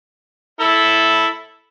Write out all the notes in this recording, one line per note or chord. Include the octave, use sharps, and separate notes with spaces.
E4 A4